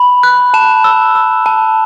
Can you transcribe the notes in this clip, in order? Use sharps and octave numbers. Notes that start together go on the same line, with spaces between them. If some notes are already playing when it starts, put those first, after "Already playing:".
Already playing: B5
F#6
A5 E7
E6
E6
A5